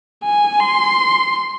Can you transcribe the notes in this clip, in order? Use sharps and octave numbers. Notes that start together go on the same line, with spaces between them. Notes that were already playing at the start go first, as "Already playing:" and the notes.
G#5
C6